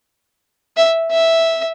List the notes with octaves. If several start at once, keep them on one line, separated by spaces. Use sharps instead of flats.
E5
E5